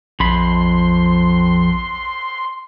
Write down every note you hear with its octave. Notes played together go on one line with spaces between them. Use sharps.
A#1 F2 B5 C6